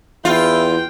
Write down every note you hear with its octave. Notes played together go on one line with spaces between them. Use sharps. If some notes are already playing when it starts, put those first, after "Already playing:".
E2 E4 F4 G5